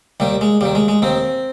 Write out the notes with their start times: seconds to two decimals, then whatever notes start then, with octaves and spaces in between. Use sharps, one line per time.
0.20 D#2 D#3 G3
0.41 G#3
0.61 D#2 D#3 G3
0.75 G#3
0.88 G#3
1.02 D#2 D#3 C4